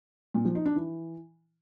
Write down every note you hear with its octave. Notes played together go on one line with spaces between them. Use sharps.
A#2
F3
D#4
D4
E3